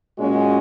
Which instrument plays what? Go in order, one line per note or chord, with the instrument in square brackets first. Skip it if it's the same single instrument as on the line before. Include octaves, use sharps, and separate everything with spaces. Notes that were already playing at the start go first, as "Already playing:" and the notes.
[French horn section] A#2 G#3 C#4 F#4